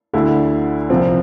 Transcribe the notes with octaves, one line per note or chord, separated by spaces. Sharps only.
D2 D3 A3 E4
C2 C3 F3 C4